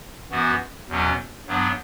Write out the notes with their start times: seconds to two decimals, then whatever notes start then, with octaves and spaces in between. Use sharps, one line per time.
0.31 F#2 E3 B3 F#4
0.89 E2 B2 F#3 C#4
1.47 G2 F#3 B3 D4